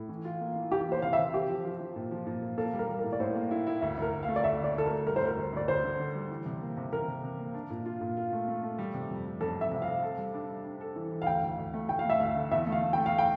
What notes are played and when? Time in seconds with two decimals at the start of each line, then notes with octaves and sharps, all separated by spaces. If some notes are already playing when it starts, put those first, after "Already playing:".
Already playing: A2
0.09 E3
0.25 F4
0.41 A#3
0.56 E3
0.71 E3 G4
0.87 A#3 C5
1.02 C3 F5
1.13 E5
1.18 C3
1.34 C4 G4
1.49 F3
1.65 F3
1.80 F3
1.96 A#2
2.11 F3
2.27 A#2
2.42 A#2
2.58 A#3 A4
2.73 G3
2.79 A#4
2.88 G3
2.99 A#4
3.04 A2
3.13 D5
3.20 A2 C5
3.35 A#3
3.51 E4
3.67 E4
3.81 D2 E5
3.97 D2 A#4
4.13 D2
4.23 F5
4.28 A3
4.36 D5
4.44 D2 E5
4.59 D3 D5
4.75 D2 A4
4.86 A#4
4.90 D2
5.06 G3 A#4
5.16 C5
5.22 D2
5.27 A#4
5.37 D2
5.53 D2 D5
5.68 D2 C5
5.84 D3
5.99 D3
6.15 G3
6.30 E3
6.46 C3
6.61 A#3
6.77 C3
6.92 C3 A#4
7.08 C3
7.24 C3
7.39 A#3
7.54 D4
7.70 A#2
7.85 F4
8.01 A#2
8.17 F4
8.32 A3
8.48 A3
8.63 A3
8.78 G3
8.94 C3
9.10 F2
9.25 G3
9.41 F2 A4
9.56 F2 E5
9.71 C3 E5
9.82 F5
9.87 C3
10.03 A4
10.18 G3
10.34 D4
10.49 D4
10.65 D4
10.81 A4
10.96 E3
11.12 E3
11.22 F5
11.27 D2 G5
11.42 D2
11.58 D2
11.74 A3
11.89 D2 G5
11.99 F5
12.05 A3 E5
12.20 D2 F5
12.36 D3
12.51 E2 E5
12.67 A3
12.72 F5
12.82 A3
12.93 A3 G5
13.06 F5
13.18 G5